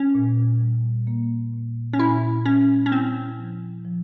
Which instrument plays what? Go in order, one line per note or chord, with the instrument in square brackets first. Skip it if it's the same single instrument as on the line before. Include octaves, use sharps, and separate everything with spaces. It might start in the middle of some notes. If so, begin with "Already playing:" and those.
Already playing: [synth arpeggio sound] C#4
[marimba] A#2
G3
A#3
A#2
[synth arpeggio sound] C#4
[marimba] A#2 [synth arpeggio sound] E4
[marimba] G3 [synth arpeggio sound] C#4
[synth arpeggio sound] C#4
[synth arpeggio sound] C4 [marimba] E4
[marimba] F3
F3